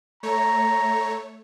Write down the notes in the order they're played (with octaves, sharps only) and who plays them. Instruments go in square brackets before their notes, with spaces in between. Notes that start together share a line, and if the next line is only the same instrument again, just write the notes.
[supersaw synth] A3 C#5 [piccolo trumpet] A#5